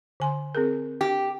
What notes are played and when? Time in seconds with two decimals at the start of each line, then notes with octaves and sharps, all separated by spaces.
0.20 D3 G#5 C6
0.55 C4 G#4 A#4
1.01 G4